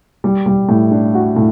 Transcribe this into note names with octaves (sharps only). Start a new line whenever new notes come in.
G3
G3
A2
D4
F#4
A2